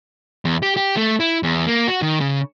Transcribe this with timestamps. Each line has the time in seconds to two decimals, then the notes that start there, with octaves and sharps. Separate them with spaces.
0.45 E2
0.63 G4
0.77 G4
0.97 A3
1.20 E4
1.43 E2
1.66 A#3
1.88 F#4
2.02 D#3
2.21 C#3